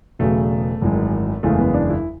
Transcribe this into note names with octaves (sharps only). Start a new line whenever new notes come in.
E1 E2 C#3 F#3 A3
G#1 F#2 E3 G#3
F#1 E2 C#3 E3 G#3 A3
B3
D4
E4